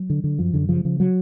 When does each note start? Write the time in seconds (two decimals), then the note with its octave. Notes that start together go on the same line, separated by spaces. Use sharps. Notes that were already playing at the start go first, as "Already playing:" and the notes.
Already playing: F#3
0.10 D3
0.24 D3
0.39 F#2 F3
0.54 F#2 D3
0.69 C#3 F3
0.85 C#3 F3
1.00 F#3